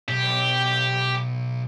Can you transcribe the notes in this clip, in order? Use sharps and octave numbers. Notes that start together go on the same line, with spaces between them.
B1 G4